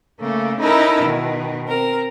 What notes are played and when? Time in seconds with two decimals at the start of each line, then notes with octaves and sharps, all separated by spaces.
0.21 C#3 A3 A#3
0.60 C#4 D#4 E4 A4 A#4
1.02 B2 D#3
1.67 C4 A#4